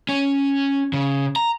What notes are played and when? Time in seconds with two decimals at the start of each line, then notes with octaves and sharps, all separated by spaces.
0.09 C#4
0.93 C#3
1.36 A#5